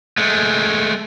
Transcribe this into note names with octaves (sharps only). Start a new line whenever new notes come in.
G#3 A3